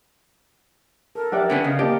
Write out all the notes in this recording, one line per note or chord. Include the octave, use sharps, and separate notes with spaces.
A4 A#4
G4 D5 E5 F#5 G5
D3 B3 C#4
C#3 D#5 F5
A#3 G4 D#5 A5